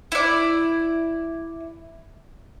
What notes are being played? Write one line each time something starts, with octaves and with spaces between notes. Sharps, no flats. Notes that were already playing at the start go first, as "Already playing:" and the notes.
E4 D5